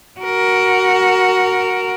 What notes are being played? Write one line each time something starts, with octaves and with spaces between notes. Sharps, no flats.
F#4 A#4